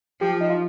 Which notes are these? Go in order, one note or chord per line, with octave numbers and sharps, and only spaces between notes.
F3 G4
D#4
F4